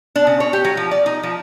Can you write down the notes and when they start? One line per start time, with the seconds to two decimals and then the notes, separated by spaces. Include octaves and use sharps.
0.16 D4
0.27 C#3
0.40 C#5
0.53 G4
0.64 F#3
0.77 F3
0.91 D5
1.06 D#4
1.23 F3